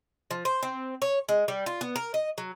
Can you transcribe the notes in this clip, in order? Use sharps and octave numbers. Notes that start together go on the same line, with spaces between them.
F3
C5
C4
C#5
G#3
G3
F4
B3
A#4
D#5
F#3